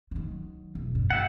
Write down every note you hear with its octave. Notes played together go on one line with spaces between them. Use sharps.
D#3 F#3
E1
G2
F#2 G4 E5 F#5